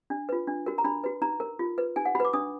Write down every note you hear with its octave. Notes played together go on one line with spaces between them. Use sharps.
D4
F4 B4
D4
F#4 A#4
A#5
D4 B5
F#4 B4
D#4 A#5
A#4
F4
B4
D#4 G#5
F#5
F#4 B4 B5 D6
D4 D#6